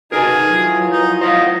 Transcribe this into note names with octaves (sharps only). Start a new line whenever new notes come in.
C#3 D#4 F#4 G#4 A#4 B4 G#5
F#3 E4 F4
D#4
C5 D#5 F5 F#5